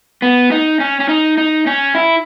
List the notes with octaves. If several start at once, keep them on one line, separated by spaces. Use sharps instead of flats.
B3
D#4
C#4
C#4
D#4
D#4
C#4
E4